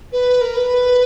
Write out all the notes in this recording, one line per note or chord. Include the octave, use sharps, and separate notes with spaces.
B4
A#4
B4